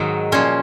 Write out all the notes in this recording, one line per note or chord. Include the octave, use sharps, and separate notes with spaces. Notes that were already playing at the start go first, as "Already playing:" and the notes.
Already playing: G#2 D#3 F#3
A#2 F3 C#4